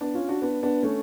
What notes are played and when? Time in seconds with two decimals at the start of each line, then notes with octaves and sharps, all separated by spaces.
0.01 B3 D4
0.15 C#4 F4
0.28 D4 F#4
0.42 B3 D4
0.63 B3 D4
0.83 A3 C#4